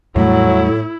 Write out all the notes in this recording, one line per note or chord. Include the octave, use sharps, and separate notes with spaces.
E2 A2 F#3 G3 A3 E4